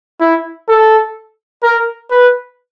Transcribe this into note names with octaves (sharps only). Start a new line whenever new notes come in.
E4
A4
A#4
B4